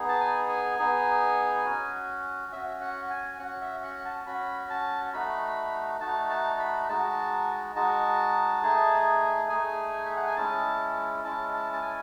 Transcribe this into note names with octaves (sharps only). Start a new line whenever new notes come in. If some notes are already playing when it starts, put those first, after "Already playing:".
Already playing: B3 D#4 G#4
A5
G#5
G#5
B3 D#4 G#4
C#4 F#4
C#4 F#4 E5
F#5
G#5
C#4 F#4 F#5
E5
F#5
A5
C#4 F#4 B5
A5
A3 D#4 F#4 B5
A3 D#4 F#4 A5
A5
B5
G#3 D#4 F#4 A5
G#3 D#4 F#4 A5
A3 D#4 G#4
A3 D#4 G#4 G#5
E5
F#5
G#5
G#3 C#4 E4 A5
G#3 C#4 E4 A5
A5
A5
G#5